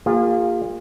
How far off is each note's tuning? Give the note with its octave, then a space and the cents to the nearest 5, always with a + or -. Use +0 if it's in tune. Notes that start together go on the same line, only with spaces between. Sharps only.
A#3 -10 F4 +10 G#4 -40